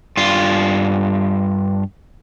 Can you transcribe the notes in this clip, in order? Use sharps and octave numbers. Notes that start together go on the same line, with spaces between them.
G2 F4